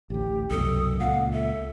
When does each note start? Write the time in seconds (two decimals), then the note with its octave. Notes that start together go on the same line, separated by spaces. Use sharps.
0.10 A1 D2 G4
0.51 C2 F#2 B2 A4 D#6
1.00 C#2 A#2 F5 F#5
1.33 A4 E5